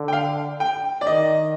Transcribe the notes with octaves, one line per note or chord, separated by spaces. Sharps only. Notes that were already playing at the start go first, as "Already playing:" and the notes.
Already playing: D3
G5
F5
G5
D5
D#3 D#5